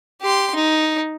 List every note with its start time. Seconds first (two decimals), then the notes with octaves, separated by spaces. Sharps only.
0.21 G4 C6
0.55 D#4